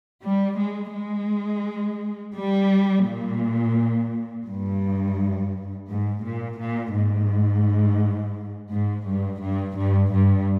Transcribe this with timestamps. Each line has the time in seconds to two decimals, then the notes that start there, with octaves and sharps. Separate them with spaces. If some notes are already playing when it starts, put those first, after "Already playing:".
0.23 G3
0.58 G#3
0.93 G#3
2.35 G3
3.05 A#2
4.47 G2
5.88 G#2
6.23 A#2
6.59 A#2
6.94 G#2
8.71 G#2
9.06 G2
9.42 G2
9.77 G2
10.12 G2